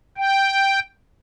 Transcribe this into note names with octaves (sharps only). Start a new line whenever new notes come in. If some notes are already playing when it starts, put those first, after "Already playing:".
G5